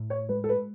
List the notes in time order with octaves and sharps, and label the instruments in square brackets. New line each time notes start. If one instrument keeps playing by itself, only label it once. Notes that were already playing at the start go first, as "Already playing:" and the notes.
Already playing: [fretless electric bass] A2
[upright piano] C#5
[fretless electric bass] G#3 [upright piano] B4
[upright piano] A4
B4